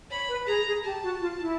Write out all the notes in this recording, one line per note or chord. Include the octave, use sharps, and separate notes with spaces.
C#5 B5
B4
G#4 A#5
G#4
G4 A5
F#4
F4
E4